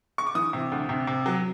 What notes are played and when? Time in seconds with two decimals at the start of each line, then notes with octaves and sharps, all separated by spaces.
0.18 C#6
0.27 D6
0.35 E3 D#6
0.53 C3
0.72 D2
0.89 C3
1.07 C3
1.26 F#3